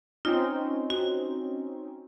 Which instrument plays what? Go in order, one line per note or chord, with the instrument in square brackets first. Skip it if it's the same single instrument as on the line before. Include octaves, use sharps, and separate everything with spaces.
[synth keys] C4 C#4 D#4 [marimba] F4
[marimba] F#4